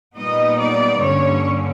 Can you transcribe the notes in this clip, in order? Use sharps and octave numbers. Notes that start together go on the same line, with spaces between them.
A#2 G3 B3 D#4 D#5
D5
G2 D3 G3 A#3 C#4 C#5